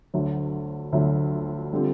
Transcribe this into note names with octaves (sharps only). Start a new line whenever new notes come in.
D2 D3 F#3
D2 D3 F#3
D3 G3 C4 F4